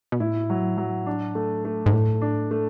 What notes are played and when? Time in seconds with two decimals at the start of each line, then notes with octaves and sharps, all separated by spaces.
0.12 B2
0.20 A2 E4
0.50 F#3
0.78 F#3
1.06 D4
1.35 A3
1.65 A3
1.86 G#2
1.93 A2 A3
2.21 D4
2.51 A3